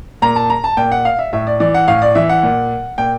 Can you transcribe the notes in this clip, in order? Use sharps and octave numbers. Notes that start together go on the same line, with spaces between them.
A#2 A#5
A5
A#5
A5
A#2 G5
F#5
F5
E5
A2 E5
D5
E3 D5
F#5
A2 F5
D5
E3 E5
F#5
A#2
A#2 G5